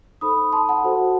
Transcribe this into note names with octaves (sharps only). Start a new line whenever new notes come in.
D#4 A4 C5 B5 D#6
A5 C6
F#5 A5
F#4 A4 C5